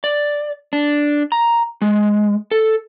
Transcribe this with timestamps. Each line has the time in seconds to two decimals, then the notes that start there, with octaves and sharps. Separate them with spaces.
0.04 D5
0.73 D4
1.32 A#5
1.82 G#3
2.51 A4